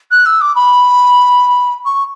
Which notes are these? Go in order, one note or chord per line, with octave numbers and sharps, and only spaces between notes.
F#6
E6
D6
B5
C#6